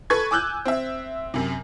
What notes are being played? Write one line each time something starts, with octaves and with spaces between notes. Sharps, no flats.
A4 B4 C#6 G#6
G#5 D6 E6 F#6 G6
C4 E5
F#2 C3